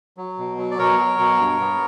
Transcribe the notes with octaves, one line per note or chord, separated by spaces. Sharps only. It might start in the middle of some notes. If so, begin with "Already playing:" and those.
F#3
B2
F#3
D5
B2 A#4 C#5
F#3
B2
G2
B3